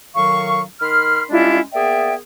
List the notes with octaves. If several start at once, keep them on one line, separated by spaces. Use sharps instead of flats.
A2 D#3 F#3 F5 C#6
D#3 B5 C6 F6
G3 G#3 C#4 D4 E4 F4
A#3 B3 G#4 D5 E5 G5